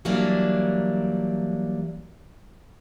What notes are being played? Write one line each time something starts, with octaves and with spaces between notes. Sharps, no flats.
E3 F#3 G3 A#3 D4